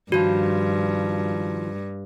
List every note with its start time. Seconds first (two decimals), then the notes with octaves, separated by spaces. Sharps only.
0.12 G2 D#3 F3 F#4